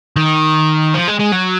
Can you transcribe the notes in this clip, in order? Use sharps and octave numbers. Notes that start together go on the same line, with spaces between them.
D#3
F3
G#3
G#3
F#3